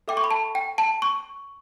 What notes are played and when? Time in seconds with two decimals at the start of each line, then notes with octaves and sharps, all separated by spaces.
0.08 A4 E5 G5 D6
0.17 C#6
0.24 B5
0.31 A5
0.55 G5
0.78 A5
1.02 C#6